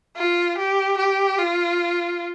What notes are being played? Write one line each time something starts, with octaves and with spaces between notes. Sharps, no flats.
F4
G4
G4
F4